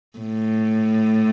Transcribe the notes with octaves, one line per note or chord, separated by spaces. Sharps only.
A2